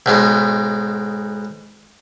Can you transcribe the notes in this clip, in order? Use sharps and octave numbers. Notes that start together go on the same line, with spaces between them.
B1 G#2 B2